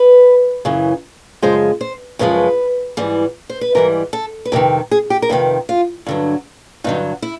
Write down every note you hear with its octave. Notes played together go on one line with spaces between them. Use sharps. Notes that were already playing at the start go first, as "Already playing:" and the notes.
Already playing: B4
F#2 C#3 E3
F#2 C#3 F3 G#3 C5
C5
F#2 C#3 F3 G#3 B4
G#2 E3 G3
C5
B4
G#2 E3 G3 A#4
A4
B4
F2 C3 D#3 A#4
G#4
G4
A#4
F2 C3 D#3 B4
F4
G2 D3 F#3
G2 D3 F#3 D#4
E4